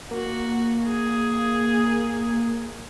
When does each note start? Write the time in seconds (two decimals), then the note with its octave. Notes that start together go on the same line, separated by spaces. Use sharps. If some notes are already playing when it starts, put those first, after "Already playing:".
0.11 A#3 F#4
0.87 G#4